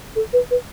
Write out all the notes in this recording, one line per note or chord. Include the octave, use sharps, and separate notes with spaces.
A4
B4
B4